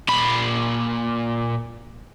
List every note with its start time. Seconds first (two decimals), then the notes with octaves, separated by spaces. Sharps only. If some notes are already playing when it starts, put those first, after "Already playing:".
0.08 A#2 B5